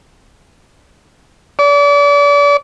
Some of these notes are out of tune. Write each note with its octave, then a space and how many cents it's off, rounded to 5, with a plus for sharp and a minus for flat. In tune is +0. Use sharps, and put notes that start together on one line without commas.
D5 -35